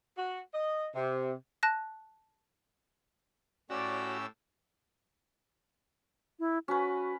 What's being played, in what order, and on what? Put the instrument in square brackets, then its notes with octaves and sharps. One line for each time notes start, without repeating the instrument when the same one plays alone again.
[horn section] F#4
D#5
C3
[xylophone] A5 F#6 A#6
[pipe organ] A2 G4 E6 [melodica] C#4 [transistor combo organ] F#4 [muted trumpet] D5
[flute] E4
[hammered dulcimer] C#4 B4 [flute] F#4